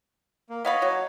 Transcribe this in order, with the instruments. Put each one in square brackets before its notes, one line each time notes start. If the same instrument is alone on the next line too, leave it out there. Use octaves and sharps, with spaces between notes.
[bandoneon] A#3
[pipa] B3 F5 B5 [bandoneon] C#5 D#5
[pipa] F#3